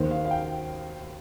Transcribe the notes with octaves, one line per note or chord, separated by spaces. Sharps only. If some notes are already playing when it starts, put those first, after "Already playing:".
Already playing: D#2 D#3 C5
F5
F5
G5